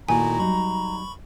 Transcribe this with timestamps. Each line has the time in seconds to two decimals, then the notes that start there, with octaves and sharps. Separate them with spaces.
0.09 A#2 D#3 A3 A#3 E4 F#4 G#5 A#5
0.39 F#3 G3 D#4 B5 C#6